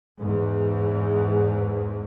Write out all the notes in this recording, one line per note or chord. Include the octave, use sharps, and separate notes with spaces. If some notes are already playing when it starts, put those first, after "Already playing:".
E2 G#2